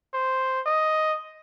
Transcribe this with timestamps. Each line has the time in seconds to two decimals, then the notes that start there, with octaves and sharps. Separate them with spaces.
0.13 C5
0.66 D#5